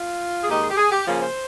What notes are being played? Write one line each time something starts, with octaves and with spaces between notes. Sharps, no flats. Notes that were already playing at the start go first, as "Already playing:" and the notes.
Already playing: F4
G#4
D#2 D#3 G#3 D#4 G4
G#4
G4
G#4
G4
C#3 F3 A#3 C#4 F4
C5